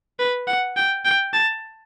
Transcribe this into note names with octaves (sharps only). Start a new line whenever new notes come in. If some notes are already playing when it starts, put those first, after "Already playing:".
B4
F#5
G5
G5
A5